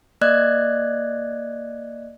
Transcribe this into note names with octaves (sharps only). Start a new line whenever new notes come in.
A#3 D5 D#5 F#6 G#6